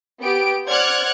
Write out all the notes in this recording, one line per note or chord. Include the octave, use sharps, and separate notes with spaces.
B3 G4 D7
C5 D5 F#5 F6 F#6 G#6